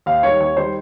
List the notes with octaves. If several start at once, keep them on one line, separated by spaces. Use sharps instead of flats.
D#2 F5
D#3 G3 C#5
D#2 C#5
D#3 G3 C5